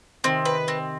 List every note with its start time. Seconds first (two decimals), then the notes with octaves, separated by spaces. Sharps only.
0.24 C3 D#3 C4
0.45 B4
0.68 C4